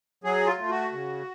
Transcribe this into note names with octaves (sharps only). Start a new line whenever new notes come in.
F#3 G#4
F4
A3
F#4
C#3